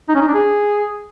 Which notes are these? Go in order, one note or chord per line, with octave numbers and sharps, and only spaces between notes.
D#4
C#4
D#4
D4
G#4